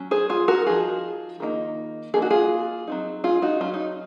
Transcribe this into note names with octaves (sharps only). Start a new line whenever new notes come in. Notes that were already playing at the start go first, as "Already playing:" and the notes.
Already playing: F#3 C#4
G#4 C5
F4 G#4
F#4 A#4
F3 C4 D#4 F4 G#4
D#3 A#3 D#4
F3 A#3 D#4 G#4
F#4
F4 G#4
F#3 C4 D#4
F4 G#4
D#4 F#4
F#3 C#4 F4
D#4